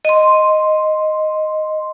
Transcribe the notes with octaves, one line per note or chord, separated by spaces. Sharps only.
D#5 C6